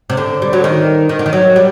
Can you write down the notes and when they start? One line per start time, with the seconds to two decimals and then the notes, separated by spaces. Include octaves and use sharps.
0.10 C3
0.17 D3
0.42 G3
0.53 F#3
0.64 D#3
1.09 D#3
1.19 D3
1.26 D#3
1.33 F#3
1.56 G3